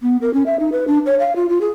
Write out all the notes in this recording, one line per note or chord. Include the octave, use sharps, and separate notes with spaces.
B3
A#4
C#4
E5
D#4
B4
D4
C#5
F5
F4
F4
G#4